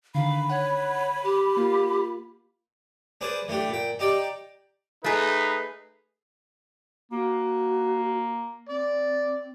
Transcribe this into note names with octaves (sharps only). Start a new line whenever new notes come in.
D3 D#3 F5 B5
C#5 F#5
G4
A#3 F4
D4 G#4 B4 C5 D5
E3 A3 D4 G4
A#2 G5
D#4 G4 D5 G5
A3 D#4 G#4 B4
A#3 F#4
C4 D5